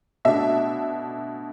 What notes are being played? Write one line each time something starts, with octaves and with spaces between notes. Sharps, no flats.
B2 A3 D4 E5